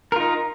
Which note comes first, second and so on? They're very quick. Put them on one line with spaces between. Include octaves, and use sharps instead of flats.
A#4 F4 D#4